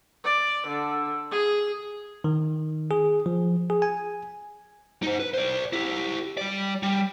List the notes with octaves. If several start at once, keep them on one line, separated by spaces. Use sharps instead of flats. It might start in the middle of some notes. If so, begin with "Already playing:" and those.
D5
D3
G#4
D#3
G#4
F3
G#4
G#5
D#4 C5
B4
C5 D5
E4 G4
G3 D5
G3